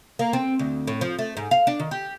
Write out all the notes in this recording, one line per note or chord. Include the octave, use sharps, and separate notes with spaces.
A#3
C4
D2
A2
F3
A3
G#2
F5
D4
D#3
G4